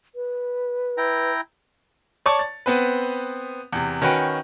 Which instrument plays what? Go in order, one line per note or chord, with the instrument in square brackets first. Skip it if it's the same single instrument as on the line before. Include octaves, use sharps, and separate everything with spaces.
[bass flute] B4
[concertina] E4 G5 A#5
[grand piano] C#5 D5 A5 C#6
A6
B3 C4 B4
E2 C3
D#3 C#4 F#4 B4 G5 D7